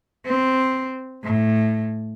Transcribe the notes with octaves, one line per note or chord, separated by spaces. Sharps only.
C4
A2